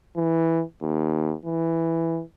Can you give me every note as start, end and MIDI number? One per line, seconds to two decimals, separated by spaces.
0.16 0.63 52
0.82 1.35 39
1.45 2.22 52